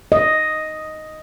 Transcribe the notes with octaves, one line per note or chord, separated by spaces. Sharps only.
D#5